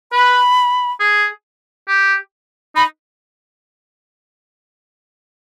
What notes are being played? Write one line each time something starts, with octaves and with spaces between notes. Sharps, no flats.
B4 B5
G#4
G4
D#4 B5